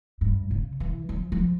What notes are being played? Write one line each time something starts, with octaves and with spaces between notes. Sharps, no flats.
G2
C#3
E3
F3
F3